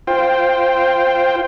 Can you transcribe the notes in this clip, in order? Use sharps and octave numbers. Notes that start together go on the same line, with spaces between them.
F4 C5 G5